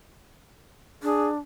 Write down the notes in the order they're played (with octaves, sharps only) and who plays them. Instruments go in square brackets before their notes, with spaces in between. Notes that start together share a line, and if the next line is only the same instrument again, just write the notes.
[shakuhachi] D4 [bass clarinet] G#4